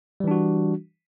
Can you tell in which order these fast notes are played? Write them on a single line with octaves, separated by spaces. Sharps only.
G3 E3 D4 F#4